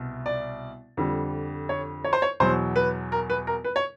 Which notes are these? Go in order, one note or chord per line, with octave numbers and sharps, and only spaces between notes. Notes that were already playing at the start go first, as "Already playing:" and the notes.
Already playing: C2 B2
D5
F2 D3 G3
C#5
C#5
C5
C#5
E2 B2 F#3 C5
B4
A#4
B4
A#4
B4
C#5